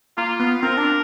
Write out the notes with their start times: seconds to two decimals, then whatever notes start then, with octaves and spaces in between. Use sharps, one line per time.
0.17 A#3 F4
0.40 B3
0.62 C4 A#4
0.77 D4